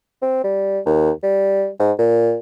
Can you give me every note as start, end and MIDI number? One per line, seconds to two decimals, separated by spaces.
0.22 0.44 60
0.44 0.80 55
0.86 1.11 39
1.23 1.69 55
1.80 1.92 44
1.99 2.37 46